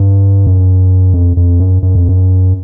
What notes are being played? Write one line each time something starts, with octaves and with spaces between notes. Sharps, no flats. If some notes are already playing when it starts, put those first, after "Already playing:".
Already playing: G2
F#2
F2
F2
F#2
F#2
F2
F#2